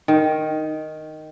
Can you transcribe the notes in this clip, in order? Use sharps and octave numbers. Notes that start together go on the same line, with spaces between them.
D#3